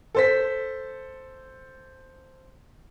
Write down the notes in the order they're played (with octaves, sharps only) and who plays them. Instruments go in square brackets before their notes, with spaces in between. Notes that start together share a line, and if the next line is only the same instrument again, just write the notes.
[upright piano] A4 C5 B6